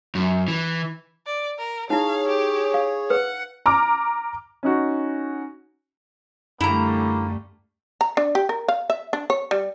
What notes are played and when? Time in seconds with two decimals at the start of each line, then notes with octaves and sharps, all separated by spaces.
0.15 F#2
0.48 E3
1.26 D5
1.58 A#4
1.90 D#4 E4 G#4 C#5 F5
2.28 G4
2.74 F5
3.10 B4 F#5
3.66 A#5 D6 F6
4.63 C#4 D#4 F#4
6.61 F#2 D3 G3 A3 A#3 E4 A#5
8.01 A#5
8.17 D4
8.35 G4
8.49 A#4
8.68 F5
8.90 E5
9.13 D4
9.30 C#5
9.51 G3